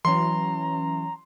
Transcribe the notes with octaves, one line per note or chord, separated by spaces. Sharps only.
E3 F#3 C#4 A#5 C6